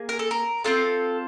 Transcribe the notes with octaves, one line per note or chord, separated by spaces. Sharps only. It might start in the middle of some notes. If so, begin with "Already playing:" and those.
Already playing: A#3 G#4
A#4
A4
A#4
C4 F4 A4